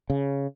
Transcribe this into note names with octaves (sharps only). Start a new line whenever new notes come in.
C#3